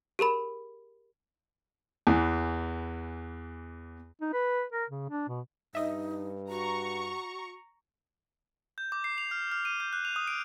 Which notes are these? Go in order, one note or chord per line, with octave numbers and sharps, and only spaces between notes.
G4 G#4 A#4 B5
E2 E3
D#4
B4
A#4
C#3
D4
B2
G2 D#4 D#5 E5
F#4 A#5 C#6
G6
D6
C7
F7
F6
F6
D#7
G6
F#6
F7
D#6
D7